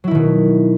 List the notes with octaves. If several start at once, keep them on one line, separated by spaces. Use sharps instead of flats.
B2 D#3 F#3 E4